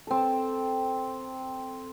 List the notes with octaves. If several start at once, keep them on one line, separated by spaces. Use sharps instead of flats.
C4 A4